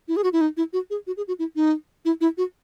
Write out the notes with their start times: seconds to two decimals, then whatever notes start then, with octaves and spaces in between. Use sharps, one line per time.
0.08 E4
0.16 G#4
0.24 F#4
0.33 E4
0.41 D#4
0.57 E4
0.73 F#4
0.90 G#4
1.07 F#4
1.17 G#4
1.28 F#4
1.39 E4
1.56 D#4
2.05 E4
2.21 E4
2.38 F#4